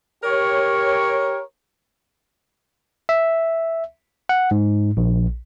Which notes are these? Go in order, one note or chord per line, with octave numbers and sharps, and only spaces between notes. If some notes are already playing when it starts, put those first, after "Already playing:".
G4 A#4 C#5
E5
F#5
G#2
A#1